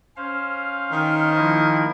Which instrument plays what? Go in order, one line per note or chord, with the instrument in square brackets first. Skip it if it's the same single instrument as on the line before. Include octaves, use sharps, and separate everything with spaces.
[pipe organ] C#4 C5 F5
[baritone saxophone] D#3
[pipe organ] F3 A#3 E4